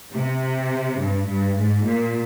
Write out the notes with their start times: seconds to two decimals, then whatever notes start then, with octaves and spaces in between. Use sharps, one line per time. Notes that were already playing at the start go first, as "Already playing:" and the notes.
0.13 C3
0.99 G2
1.27 G2
1.56 G#2
1.84 A#2